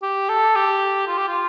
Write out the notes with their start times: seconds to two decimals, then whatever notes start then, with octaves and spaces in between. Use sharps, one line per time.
0.03 G4
0.29 A4
0.55 G4
1.07 F4
1.18 G4
1.28 F4